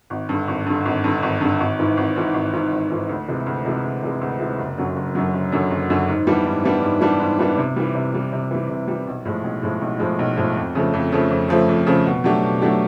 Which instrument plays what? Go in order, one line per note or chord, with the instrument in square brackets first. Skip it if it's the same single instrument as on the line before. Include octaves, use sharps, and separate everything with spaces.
[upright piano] G#1
G2 D3
G#1
G2 D3
G#1
G2 D3
G#1
G2 D3
G#1
G#2 E3
G#1
G#2 E3
G#1
G#2 E3
G#1
G#2 E3
D2
C3 E3 G#3
D2
C3 E3 G#3
D2
C3 E3 G#3
D2
C3 E3 G#3
F#1
F#2 D3 F#3
F#1
F#2 D3 F#3
F#1
F#2 D3 F#3
F#1
F#2 D3 F#3
G#2
E3 G3 B3 D4
G#2
E3 G3 B3 D4
G#2
E3 G3 B3 D4
G#2
E3 G3 B3 D4
C3
E3 G3
C3
E3 G3
C3
E3 G3
C3
E3 G3
B1
A2 F3 G#3
B1
A2 F3 G#3
B1
A2 F3 G#3
B1
A2 F3 G#3
F2
C#3 F3 A3
F2
C#3 F3 A3
F2
C#3 F3 A3
F2
C#3 F3 A3
B2
F#3 A3 D4 G4
B2
F#3 A3 D4 G4